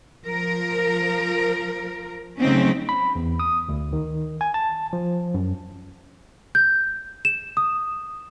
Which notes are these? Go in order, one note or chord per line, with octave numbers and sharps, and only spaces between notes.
F3 A#4
C#3 F#3 A3 C4 C#4 D#4
B5
E2
D#6
D2
D#3
G#5
A5
F3
F#2
G6
E7
D#6